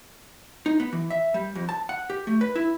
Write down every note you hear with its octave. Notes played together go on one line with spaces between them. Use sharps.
D#4
B3
E3
E5
G3
F2
A5
F#5
G4
A3
B4
E4